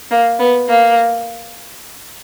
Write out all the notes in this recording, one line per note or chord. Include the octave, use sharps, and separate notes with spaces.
A#3
B3
A#3